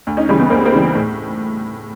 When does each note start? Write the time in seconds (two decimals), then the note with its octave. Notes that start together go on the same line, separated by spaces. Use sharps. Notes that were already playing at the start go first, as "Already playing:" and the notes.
0.07 D2
0.17 C#4 D#4
0.29 C#3 E3 G3 C#4 D#4
0.40 B3
0.50 D2 A#3 C4
0.65 A#3 C4
0.73 C#3 E3 G3
0.95 A2